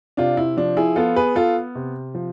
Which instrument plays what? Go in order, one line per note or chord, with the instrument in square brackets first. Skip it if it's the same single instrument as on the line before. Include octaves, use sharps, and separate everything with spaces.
[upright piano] C3 D4 F4
E4
F3 D4
E4 G#4
B3 F4 A4
G#4 B4
B3 F4 A4
C3
F3